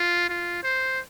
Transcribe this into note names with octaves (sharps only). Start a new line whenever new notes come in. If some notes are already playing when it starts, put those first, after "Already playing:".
Already playing: F4
F4
C5